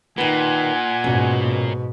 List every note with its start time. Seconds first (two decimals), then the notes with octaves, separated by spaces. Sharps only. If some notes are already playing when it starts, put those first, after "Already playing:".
0.18 A#2 D#3 B4 F#5 G#5
1.04 G#2 B2 C#4